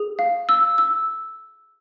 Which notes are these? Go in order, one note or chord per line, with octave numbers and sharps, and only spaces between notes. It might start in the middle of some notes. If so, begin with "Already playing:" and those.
Already playing: G#4
F5
E6
E6